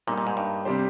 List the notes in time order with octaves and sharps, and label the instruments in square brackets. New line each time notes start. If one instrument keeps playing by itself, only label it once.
[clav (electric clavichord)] A#2 [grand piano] G3 A#3 D#4
[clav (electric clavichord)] A#2
G#2
G2
[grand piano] C3 G3 D4 G4 C5